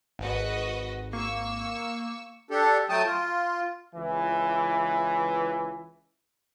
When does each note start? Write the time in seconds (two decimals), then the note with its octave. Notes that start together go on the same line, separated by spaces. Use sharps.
0.19 G#1 F#4 B4 D#5
1.13 A#3 C#6 E6
2.51 D4 G4 A4
2.89 F#3 A3 G5 A5 D#6
3.05 F4
3.95 C#2 E3